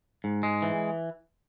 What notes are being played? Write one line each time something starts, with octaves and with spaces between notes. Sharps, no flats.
G#2
G#3
E3